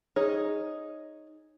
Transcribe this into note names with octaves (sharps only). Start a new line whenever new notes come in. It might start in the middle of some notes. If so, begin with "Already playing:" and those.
D#4 G#4 C#5